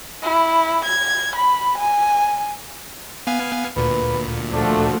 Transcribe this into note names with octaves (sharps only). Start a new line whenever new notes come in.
E4
G#6
B5
G#5
B3 F5 G#5
D2 A#2 B4
F3 A3 D4 F#4